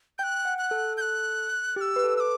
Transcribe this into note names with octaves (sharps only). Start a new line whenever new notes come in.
G5 F#6 G6
F#5
F#6
A4
G6
F#6
G4 E6 F#6
B4
A4
E6
D6